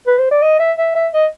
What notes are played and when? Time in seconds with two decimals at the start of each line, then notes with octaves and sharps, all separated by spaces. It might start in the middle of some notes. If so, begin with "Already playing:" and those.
0.07 B4
0.19 C5
0.31 D5
0.42 D#5
0.60 E5
0.78 E5
0.95 E5
1.13 D#5